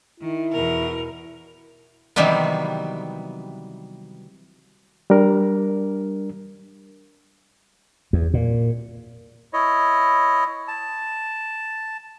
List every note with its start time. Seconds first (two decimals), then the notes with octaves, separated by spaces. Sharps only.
0.20 D#3 E4
0.52 E2 B2 A#4
2.16 C3 D#3 E3 F#3 G3 B3
5.10 G3 D4 A#4
8.13 E2
8.34 A#2
9.53 E4 C#5 D#5
10.68 A5